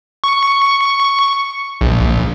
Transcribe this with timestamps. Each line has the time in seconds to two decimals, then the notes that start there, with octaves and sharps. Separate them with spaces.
0.24 C#6
1.81 A#1